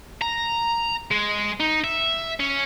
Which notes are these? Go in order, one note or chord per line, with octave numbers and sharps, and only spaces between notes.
A#5
G#3
D#4
E5
C#4